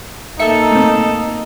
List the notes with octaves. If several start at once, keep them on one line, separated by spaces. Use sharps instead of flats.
A#3 D#4 A4 E5 C#7
A3 C4